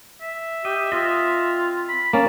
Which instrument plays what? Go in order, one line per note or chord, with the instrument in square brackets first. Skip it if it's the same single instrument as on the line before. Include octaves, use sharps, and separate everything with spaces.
[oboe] E5
[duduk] G4 [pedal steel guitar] D#5
[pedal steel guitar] C4 D#5 [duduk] F4
[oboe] B5
[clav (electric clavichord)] A#3 C#4 [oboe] A5